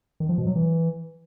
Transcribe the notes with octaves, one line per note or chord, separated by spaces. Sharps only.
D#3
F3
B2
F#3
E3